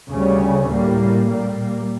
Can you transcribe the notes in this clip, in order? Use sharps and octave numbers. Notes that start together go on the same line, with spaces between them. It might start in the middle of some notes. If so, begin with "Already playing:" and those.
D2 C#3 G3 C#4
A2 G3 A#3
A#2 G3 A#3